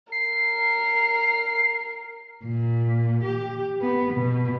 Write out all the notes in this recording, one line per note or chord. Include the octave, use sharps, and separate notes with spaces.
A#4 C7
A#2
G4
B3
B2